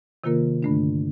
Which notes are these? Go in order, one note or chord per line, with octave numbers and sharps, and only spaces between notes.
C3 D#3 A#3 F4 A#4
G2 D3 A3 D4